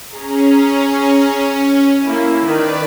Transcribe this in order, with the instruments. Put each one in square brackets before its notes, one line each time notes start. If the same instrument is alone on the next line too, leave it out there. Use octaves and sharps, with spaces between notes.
[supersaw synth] C#4 [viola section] G#4 A#5
[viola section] A#3 E4
[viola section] D#3 [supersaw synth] B4 D5